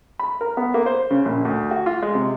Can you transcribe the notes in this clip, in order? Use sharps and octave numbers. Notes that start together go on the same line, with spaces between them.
B5
A#4
B3
A#3
C5
C#3
A#1
D2
F#4
F4
G#3
C3